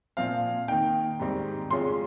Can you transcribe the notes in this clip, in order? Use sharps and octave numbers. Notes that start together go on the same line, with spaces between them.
A#2 F3 C4 F5
D#3 A#3 D#4 G5
G#2 D#3 G3 C4
F2 C#3 G#3 C#4 F4 C6